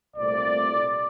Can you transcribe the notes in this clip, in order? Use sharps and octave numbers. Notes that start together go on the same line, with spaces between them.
C2 A#2 A3 C4 D5